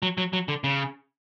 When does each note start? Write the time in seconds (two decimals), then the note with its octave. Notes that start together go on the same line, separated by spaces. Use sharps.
0.03 F#3
0.18 F#3
0.33 F#3
0.48 D3
0.64 C#3